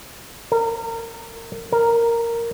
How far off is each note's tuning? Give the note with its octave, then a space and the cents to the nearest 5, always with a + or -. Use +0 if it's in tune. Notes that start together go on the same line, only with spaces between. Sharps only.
A#4 -30
A#4 -5